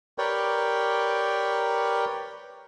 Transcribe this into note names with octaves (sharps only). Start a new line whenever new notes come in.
G4 A#4 B4 C#5 D5 G5